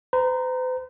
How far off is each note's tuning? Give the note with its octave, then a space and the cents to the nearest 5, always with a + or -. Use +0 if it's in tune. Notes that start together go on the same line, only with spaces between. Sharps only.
C5 -45 A#5 +0